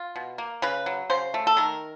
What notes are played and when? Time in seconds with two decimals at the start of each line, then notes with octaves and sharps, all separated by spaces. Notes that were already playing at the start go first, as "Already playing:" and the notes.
Already playing: F4
0.16 B2
0.38 A#3
0.62 C#3 B4
0.86 F#3
1.10 C#3 C5
1.34 A3
1.47 A4
1.57 D#3 A#4